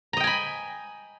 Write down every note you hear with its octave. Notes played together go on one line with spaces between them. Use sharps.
D#5 G5 G#5 A#5 B5